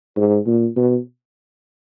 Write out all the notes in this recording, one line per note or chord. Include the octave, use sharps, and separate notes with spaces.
G#2
A#2
B2